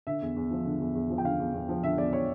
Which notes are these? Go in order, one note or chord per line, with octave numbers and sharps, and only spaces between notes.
D3 E5
E2
E2
F3
D3
E2
E2
F3
G5
D3 F5
E2
E2
F3
D3 E5
E2 D5
C#5